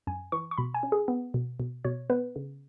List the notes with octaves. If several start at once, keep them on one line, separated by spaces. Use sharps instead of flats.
F#2 G#5
E3 C#6
C#6
B2 B5
G#5
C#4
G#4
B3
B2
B2
B2 C#5
B3 B4
C#3